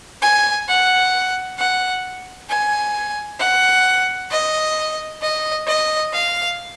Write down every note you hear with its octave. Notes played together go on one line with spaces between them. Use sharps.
G#5
F#5
F#5
G#5
F#5
D#5
D#5
D#5
F5